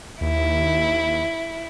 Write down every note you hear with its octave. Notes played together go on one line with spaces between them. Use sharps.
D#2 E4